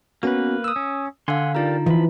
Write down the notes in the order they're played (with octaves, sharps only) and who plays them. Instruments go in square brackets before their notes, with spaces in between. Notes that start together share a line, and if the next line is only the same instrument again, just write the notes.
[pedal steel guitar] A#3 B4 [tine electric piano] B3 C#4 F#4
[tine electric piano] D#6 E6
[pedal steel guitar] C#4
[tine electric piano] D3 [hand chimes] D4 F5 [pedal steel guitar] F#5 G#5 C6
[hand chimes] D#4 F4 A#5 [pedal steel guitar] G4 A#4 D5
[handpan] E3 [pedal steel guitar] F3 B5